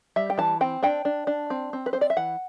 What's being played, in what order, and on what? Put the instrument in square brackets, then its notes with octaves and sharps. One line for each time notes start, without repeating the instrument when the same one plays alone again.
[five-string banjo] G3 E5
G5
E3 A5
C4 G5
D4 G5
D4
D4
C4
C4
B4
C4 C5
D5
E5
E3 F#5